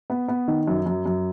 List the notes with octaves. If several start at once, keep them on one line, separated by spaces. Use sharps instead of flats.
B3
B3
D#3
F#2
F#2
F#2